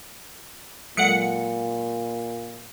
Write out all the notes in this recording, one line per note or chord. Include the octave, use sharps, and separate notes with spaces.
A#2 F#3 G#3 A4 F#5 C#7